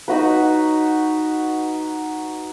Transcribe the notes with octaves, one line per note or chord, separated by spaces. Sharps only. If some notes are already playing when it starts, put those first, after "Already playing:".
D#4 F#4 B4